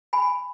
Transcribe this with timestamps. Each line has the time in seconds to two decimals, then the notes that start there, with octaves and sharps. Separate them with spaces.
0.13 G#5 B5